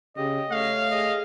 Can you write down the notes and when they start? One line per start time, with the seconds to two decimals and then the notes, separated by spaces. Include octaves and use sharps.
0.17 C#3 G4 D#5
0.52 A3 C#5 F5
0.92 G#4 D#5